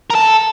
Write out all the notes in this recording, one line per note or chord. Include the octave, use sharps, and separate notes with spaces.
A#4
A4